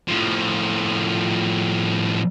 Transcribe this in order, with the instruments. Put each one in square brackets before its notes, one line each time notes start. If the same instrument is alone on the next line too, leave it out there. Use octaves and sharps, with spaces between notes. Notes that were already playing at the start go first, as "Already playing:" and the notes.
[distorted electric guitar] A2 F3